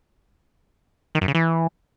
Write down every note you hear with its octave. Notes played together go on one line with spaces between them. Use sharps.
D#3
F#2
C#3
E3